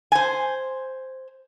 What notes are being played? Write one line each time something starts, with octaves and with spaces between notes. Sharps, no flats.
C5 G#5